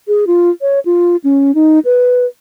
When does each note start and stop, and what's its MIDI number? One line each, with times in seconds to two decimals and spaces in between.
0.08 0.25 68
0.27 0.50 65
0.61 0.80 73
0.86 1.16 65
1.24 1.54 61
1.55 1.79 63
1.85 2.25 71